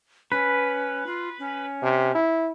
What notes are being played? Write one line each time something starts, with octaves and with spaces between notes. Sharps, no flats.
C#4 B4
F4
C#4
C3
E4